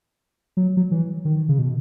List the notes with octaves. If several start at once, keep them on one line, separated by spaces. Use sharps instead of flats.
F#3
F#3
E3
D#3
C#3
B2